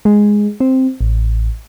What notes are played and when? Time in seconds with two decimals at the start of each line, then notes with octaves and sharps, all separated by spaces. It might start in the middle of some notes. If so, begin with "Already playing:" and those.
0.05 G#3
0.60 C4
1.01 A1